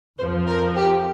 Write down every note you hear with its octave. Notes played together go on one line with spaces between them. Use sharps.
F2 F3 C5
A#4
G4